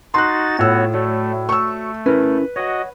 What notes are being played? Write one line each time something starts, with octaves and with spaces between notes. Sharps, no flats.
D#4 F#4 C6 F#6 A6
A2 B3 F4 F#4 C#5 E6
A3 F#4 C#5 D5
A3 C#6 E6
C#4 E4 A#4 B4
F#4 C#5 D#5 F#5